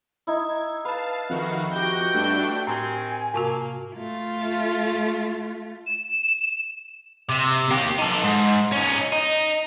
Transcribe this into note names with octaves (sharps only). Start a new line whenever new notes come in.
D#4 E4 G#6
B4 F5 A5
F2 D#3 F#4 F5
F#4 G4 G5 A#6
G2 A3 D4
A2 D#3 C4 G#5
G#2 C3 A#3 F#4
A3 F4
E7
C3
A#3 G4
D#4 A4
G#2
C#4 D#4
D#4